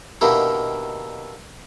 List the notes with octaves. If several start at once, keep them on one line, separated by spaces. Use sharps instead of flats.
B2 D3 D#3 A#3 E4 G4